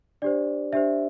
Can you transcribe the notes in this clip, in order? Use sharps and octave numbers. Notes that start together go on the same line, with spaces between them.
D4 G4 C5 D5
D4 G4 C5 E5